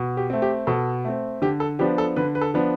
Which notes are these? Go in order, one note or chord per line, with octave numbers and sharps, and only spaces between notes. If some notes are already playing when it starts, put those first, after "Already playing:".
Already playing: B2
G4
A3 C4
G4
B2 A4
A3 C4
D3 G4
A4
F3 B3 D4 G4
A4
D3 B4
B4
A4
F3 B3 D4